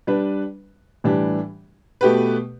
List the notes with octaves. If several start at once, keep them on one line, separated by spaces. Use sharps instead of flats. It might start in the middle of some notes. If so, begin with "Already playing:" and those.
G3 D4 B4
A2 E3 G3 D4 G4
B2 A3 G4 B4